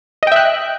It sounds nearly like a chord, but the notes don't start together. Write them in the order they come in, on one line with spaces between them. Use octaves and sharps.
D#5 G5 E5 F#6